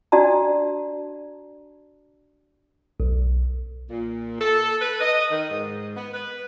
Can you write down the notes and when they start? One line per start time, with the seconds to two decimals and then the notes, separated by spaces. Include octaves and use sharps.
0.12 D4 F#4 D5 A5 A#5
3.00 B1
3.90 A#2
4.41 A4
4.81 B4
5.00 D#5
5.31 D#3
5.51 G#2
5.95 B3
6.13 B4